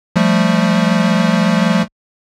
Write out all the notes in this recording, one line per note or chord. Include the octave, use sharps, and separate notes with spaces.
F3 G3 A3